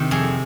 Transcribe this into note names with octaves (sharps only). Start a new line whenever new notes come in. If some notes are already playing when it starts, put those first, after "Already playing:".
Already playing: C3 D#3
F2 G#4